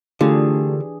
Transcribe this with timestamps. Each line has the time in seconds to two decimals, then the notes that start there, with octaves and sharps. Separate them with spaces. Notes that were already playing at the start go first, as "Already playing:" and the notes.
0.21 D3 E3 A3 D4 F4 G4 G#4